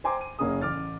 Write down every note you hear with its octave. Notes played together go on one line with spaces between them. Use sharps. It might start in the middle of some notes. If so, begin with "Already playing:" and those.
C5 G5 G#5 A#5 C6 D6
D#7
F#1 A#3 C#4 G#4 D#6
A1 D6 F6 A6